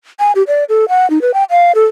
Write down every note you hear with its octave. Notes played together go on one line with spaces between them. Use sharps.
G#5
G4
D5
A4
F#5
D#4
B4
G5
F5
A4